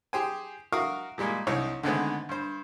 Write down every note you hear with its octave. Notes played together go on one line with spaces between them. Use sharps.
G4 G#4 C5 G5 G#5
F#4 A#4 E5 F5 C#6 D#6
A#2 G3 G#3 A#3
C2 C4 D#4 C#5 E6
D3 D#3 G#3 A3 B3 C4
G2 C5